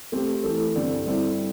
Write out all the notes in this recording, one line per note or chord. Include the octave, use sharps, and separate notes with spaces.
A3 C4 G4
E3 A3 E4 A4
G2 D3 G3 C4
G3 C4 E4 A4